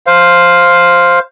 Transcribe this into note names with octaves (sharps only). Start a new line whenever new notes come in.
C5 F5